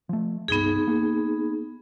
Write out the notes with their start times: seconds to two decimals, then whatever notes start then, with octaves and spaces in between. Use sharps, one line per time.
0.09 F3 A3
0.48 C#2 G2 B3 D#4 G#4
0.87 A#3